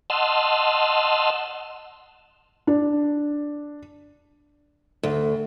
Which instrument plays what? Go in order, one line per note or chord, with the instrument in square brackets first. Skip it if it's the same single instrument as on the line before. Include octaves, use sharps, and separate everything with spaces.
[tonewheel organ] D#5 F#5 A5 C6 E6 F6
[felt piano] D4
[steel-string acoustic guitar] D2